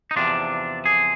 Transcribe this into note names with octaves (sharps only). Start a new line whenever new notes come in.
D#4
E2 C3 F3 D4
G#4